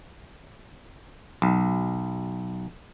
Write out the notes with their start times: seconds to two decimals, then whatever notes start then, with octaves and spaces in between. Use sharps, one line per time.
1.42 B1